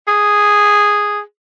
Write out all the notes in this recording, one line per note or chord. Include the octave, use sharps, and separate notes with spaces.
G#4